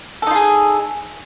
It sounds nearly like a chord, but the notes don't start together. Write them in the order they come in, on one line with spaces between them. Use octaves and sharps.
A4 D#4 F4 G#4